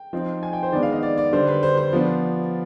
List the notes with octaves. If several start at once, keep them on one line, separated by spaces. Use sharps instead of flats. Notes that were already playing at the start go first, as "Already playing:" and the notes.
Already playing: G5
F3 C4 D#4
G#5
G5
C5
D#3 G#3 B3 D4 D5
F5
D#5
D5
D5
D3 G3 D4 C5
B4
C5
C5
F3 B3 D4